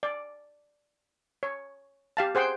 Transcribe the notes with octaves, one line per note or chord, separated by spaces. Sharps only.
D5
C#5
G4 F5 A5
G#4 C5 F#5 G5 C6